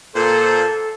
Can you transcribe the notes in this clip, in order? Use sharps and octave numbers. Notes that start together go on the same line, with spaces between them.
A#2 A4 C5